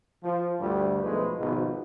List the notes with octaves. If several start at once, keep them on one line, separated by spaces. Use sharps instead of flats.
F3
D2 G2 D3 G3
B1 F3 G#3 A3 B4
G#1 B2 F3 D#4 F4